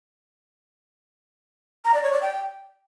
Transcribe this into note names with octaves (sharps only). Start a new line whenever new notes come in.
A#5
D5
C#5
D5
G5